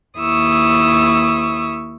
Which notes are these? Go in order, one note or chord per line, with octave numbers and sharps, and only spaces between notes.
D#2 E4 C#6 D#6 E6